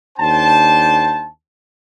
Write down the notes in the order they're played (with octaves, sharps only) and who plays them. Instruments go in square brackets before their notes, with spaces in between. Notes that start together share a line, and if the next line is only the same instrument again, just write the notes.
[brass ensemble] D#2 D4 C5 G5 A5